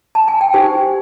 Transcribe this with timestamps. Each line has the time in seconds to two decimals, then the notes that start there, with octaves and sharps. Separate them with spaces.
0.15 A5
0.28 G#5
0.41 G5
0.54 D#4 G4 C5 G#5